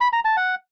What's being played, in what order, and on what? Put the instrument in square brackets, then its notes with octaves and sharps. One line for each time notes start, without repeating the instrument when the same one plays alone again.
[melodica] B5
A#5
A5
F#5